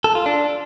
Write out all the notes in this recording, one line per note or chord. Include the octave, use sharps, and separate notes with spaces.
A4
F4
D4